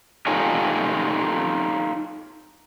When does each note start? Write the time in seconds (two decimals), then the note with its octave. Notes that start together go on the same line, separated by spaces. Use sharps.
0.27 D#4 F4 G4 A4 C#5 G#5